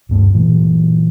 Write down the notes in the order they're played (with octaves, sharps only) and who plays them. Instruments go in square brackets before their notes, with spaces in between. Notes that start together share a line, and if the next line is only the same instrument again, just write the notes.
[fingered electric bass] D1 G2 A3
A#2 E3 F#3